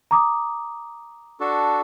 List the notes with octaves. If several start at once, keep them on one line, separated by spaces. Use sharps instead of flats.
A#5 D6 D#6
D4 F#4 A4